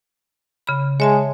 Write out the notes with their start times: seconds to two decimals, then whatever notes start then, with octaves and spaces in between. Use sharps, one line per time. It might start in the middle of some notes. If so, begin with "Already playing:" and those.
0.67 C#3 B5
1.00 G#3 C#5 E5 A5